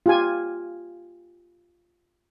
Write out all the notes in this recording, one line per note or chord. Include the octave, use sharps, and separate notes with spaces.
F4 G4 G#5